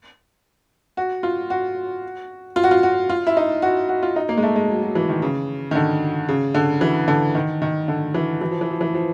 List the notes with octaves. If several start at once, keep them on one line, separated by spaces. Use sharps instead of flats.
F#4
F4
F#4
F4
F#4
F4
F#4
F4
E4
D#4
F#4
F#4
F4
D#4
A#3
G#3
A3
G#3
F#3
F#3
E3
D#3
C#3
D#3
D3
C#3
D3
E3
D3
D#3
D#3
D3
E3
E3
F3
E3
F3
E3
F3